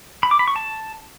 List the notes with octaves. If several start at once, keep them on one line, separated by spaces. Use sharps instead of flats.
B5
D6
B5
C#6
A5